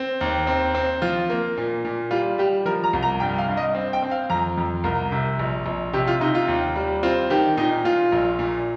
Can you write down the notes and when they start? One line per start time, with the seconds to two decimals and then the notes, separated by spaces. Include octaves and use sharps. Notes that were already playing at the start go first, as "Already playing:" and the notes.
Already playing: C4
0.21 D#2
0.47 C4
0.74 C4
1.02 F3 F4
1.30 A#3
1.57 A#2
1.85 A#2
2.11 G3 F4
2.38 G3 G4
2.65 F3 A#4
2.84 A#5
2.93 C2
3.03 A#5
3.20 G2 G5
3.38 F5
3.48 G2
3.57 D#5
3.75 C4
3.93 G5
4.02 C4
4.11 F5
4.30 F2 A#5
4.58 F2
4.84 C2 A#4
5.12 C3
5.39 A#1
5.66 A#1
5.93 C3 G4
6.07 F4
6.21 C3 D#4
6.35 F4
6.48 D#2
6.76 G3
7.03 C4 F4
7.30 D#3 G4
7.57 A#2 D#4
7.84 A#2 F4
8.12 A#1
8.39 A#2